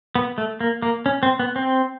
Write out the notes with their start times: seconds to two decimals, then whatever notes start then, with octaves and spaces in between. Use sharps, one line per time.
0.15 B3
0.38 A3
0.61 A#3
0.82 A#3
1.06 C#4
1.23 C4
1.40 B3
1.56 C4